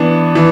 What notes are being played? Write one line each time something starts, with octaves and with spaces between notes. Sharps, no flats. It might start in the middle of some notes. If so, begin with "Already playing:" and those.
Already playing: E3 B3 D4
E3